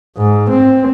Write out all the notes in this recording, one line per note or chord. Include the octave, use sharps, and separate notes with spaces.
G#2
C4